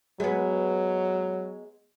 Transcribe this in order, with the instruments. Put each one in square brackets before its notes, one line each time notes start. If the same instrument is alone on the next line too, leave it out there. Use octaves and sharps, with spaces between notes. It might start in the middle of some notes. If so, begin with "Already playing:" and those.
[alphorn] F#3 [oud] G#3 B3